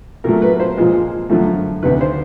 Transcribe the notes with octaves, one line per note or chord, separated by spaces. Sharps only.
A#2 F#3 A3 A#4
B4
C5
A#2 F3 G#3
F#2 D3 F3 A3
D2 C3 D#3 B4
C5